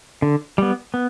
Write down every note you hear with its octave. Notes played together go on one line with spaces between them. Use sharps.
D3
G3 B3
B3